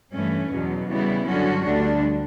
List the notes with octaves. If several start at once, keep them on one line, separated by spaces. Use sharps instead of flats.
G2 E3 A3 C#4
E2 B2 F#3
C#3 E3 G3 B3 E4
G2 D3 F#3 C#4 F#4
D2 D3 G3 D4